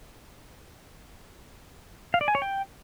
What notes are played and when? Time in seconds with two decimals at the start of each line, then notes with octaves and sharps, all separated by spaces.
2.14 F5
2.21 D5
2.28 G#5
2.35 C#5
2.42 G5